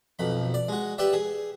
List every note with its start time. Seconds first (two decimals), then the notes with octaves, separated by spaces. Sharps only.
0.19 B1 F2 B5
0.54 D5
0.68 G#3 F#4
0.98 G4 B4 D5 E5
1.13 G#4